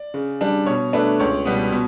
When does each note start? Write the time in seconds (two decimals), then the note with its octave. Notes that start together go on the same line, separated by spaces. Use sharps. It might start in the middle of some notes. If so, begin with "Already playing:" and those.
Already playing: D5
0.14 C#3
0.41 G3 D4
0.66 B2 C#5
0.93 A3 D4 B4
1.20 C#2 C#5
1.45 B2 G3 B3
1.72 B2